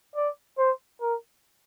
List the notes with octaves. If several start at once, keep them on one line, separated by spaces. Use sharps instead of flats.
D5
C5
A#4